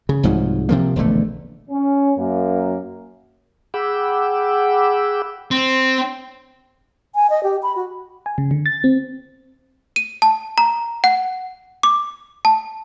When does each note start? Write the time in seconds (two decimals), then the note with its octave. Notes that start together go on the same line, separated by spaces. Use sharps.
0.09 C#3
0.23 C2 G#2 F3 F#3
0.69 C3 F3 A#3
0.96 E1 A#1 D3 A3
1.70 C#4
2.18 F#2 A#3
3.74 G#4 F#5 G5 B5 D6 E6
5.51 C4
7.15 G#5
7.30 D#5
7.43 G4
7.63 B5
7.76 F#4
8.26 G#5
8.38 C#3
8.51 D3
8.66 A6
8.84 C4
9.96 D#7
10.22 A5
10.58 A#5
11.04 F#5
11.83 D6
12.45 A5